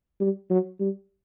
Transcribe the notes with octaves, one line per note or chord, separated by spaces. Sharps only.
G3
F#3
G3